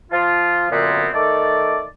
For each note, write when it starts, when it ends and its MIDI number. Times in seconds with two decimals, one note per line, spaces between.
0.11 0.66 53
0.11 0.66 65
0.71 1.07 42
0.71 1.07 46
0.71 1.07 50
0.71 1.07 59
0.71 1.07 60
1.13 1.83 51
1.13 1.83 57
1.13 1.83 69
1.13 1.83 74